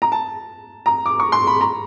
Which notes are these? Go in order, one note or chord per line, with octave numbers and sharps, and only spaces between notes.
A#5
A5
A#5
D6
C#6
C6
B5
A#5